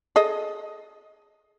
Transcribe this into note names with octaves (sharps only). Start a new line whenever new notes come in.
G#4 A4 D#5